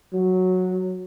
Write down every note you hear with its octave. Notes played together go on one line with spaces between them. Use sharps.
F#3